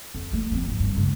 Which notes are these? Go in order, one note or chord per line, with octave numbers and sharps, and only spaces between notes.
F2
F3 A3
F3 C4
G#2
G2
C#2